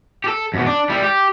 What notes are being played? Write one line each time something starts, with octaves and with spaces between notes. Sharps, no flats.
G4 A4
F#2 B2
D4
G3 E4
G4